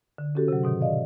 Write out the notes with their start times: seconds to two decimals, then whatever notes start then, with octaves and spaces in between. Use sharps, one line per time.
0.18 D3
0.35 C#4 F#4 G4 A4
0.48 C3 F#3
0.63 G#2 B2 D#3
0.81 D5 D#5 F5